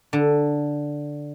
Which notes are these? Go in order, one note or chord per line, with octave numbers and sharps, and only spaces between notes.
D3